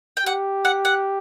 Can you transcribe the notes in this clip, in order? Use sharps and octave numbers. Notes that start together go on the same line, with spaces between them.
G5
G4 F#5
F#5
F#5